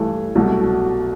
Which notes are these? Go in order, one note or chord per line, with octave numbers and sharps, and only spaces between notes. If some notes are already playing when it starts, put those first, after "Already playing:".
Already playing: G2 E3 A3
C2 B2 F#3 A3